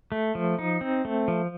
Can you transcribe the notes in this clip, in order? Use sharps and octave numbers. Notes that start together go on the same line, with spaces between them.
A3
F3
D#4
C4
A3
F3